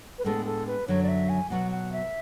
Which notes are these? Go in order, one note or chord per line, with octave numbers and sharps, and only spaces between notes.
B4
A2 G#3 B3 D4 A4
A4
B4
F#2 D3 F#3 C#5
D5
E5
G#5
B2 F#3 B3 F#4 F#5
F#5
E5